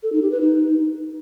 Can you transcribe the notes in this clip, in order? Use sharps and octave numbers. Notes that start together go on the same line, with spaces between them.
A4
D#4
G4
B4
D#4